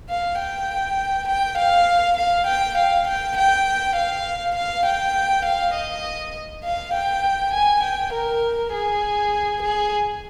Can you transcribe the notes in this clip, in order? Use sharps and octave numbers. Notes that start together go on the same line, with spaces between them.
F5
G5
G5
F5
F5
G5
F5
G5
G5
F5
F5
G5
F5
D#5
F5
G5
G#5
G5
A#4
G#4
G#4